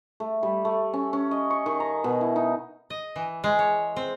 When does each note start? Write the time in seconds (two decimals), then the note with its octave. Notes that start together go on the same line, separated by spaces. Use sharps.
0.20 A3
0.43 G3
0.65 A3
0.93 C#4
1.13 C#4
1.31 D#5
1.50 C#6
1.66 D#3
1.80 A#5
2.04 B2
2.21 E4
2.36 D#4
2.90 D#5
3.16 E3
3.44 G#3
3.59 C#5
3.96 C4